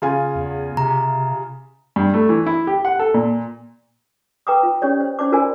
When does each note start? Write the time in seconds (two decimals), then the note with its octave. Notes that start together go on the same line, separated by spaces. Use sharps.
0.02 C#3 F4 G#5
0.36 E2
0.77 C3 A#5
1.96 G2
2.14 A3
2.29 E3
2.46 E4
2.67 G4
2.85 F#5
2.99 A4
3.14 A#2
4.47 B4 G5 A#5 D6 D#6
4.63 F4
4.82 C#4 G4 C#5 D5
5.00 C5
5.19 C#4 C5 D5 A5 D6
5.32 F4 F#4 A#4 C5 D5 G#5